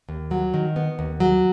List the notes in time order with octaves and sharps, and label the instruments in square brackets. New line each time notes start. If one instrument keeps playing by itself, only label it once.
[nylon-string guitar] D#2
F#3
D#3
B3
D#2
F#3